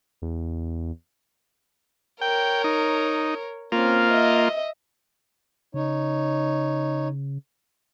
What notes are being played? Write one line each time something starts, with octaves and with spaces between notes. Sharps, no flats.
E2
A#4 C#5 G5
D#4
A#3 C4 C#4 F4
D#5 E5
C#3 D#4 C#5